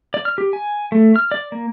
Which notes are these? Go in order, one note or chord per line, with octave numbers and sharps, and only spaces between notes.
D5
F6
G4
G#5
A3
F6
D5
A#3